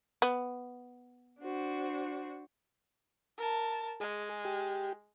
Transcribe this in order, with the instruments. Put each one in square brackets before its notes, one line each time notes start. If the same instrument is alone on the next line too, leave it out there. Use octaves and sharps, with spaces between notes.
[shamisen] B3
[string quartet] D4 F#4 C5
[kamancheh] A#4 A5
[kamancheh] G#3 [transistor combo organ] G#4
[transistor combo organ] G4